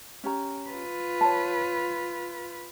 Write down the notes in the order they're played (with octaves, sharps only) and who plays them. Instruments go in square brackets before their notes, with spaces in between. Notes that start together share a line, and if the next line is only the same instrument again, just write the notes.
[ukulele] C#4 G4 A#5
[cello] F4 B4
[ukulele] C#5 A5